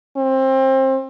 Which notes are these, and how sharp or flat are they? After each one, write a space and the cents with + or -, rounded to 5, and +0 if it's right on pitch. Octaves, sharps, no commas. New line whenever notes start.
C4 +25